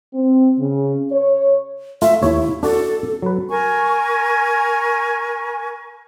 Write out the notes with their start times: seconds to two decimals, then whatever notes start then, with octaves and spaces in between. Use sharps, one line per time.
0.14 C4
0.59 C#3
1.12 C#5
2.02 A3 F4 E5
2.23 D#2 E4 C#5
2.63 D4 F#4 A4 D5
3.22 F#3 B4
3.50 A#4 G#5 C#6